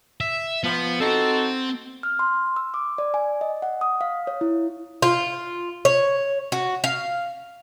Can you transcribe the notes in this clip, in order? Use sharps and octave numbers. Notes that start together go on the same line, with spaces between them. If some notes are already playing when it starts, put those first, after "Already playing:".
E5
F3 B3
C4 D#4 F#4 A4
F6
C6
E6
D6
D5
G#5
D#5
F#5
D#6
F5
C#5
E4
F4
C#5
F#4
F5